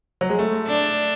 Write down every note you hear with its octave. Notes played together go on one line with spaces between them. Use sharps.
F#3
G#3
A3
D4